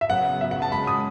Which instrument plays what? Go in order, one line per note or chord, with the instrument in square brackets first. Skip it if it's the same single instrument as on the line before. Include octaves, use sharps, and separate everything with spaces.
[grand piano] E5
[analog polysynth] F#2 C#3 F#3 B3 [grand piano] F#5
[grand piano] E5
F#5
A5
[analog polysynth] F#2 C#3 G#3 [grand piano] B5
[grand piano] D#6